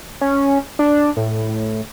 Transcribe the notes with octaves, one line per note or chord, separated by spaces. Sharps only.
C#4
D4
A2